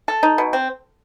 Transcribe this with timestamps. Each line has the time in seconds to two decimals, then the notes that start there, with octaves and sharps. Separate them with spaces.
0.08 A4
0.23 D#4
0.38 B2
0.53 C4